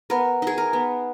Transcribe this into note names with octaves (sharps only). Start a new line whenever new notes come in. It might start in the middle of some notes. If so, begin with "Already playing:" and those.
B3 A#4
D#4 G#4
A#4
B3